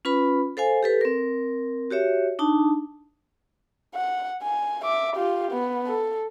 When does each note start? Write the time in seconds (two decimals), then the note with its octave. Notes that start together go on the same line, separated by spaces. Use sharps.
0.05 C#4 F4 B4 B5
0.57 A4 C5 F5 G#5
0.83 G4 A4 B4
1.01 C4 A#4
1.90 F#4 G4 C#5 E5
2.39 D4 D#4 A5
3.95 F#5
4.43 G#5
4.84 E5 D6
5.16 F4 G4
5.51 B3
5.87 A4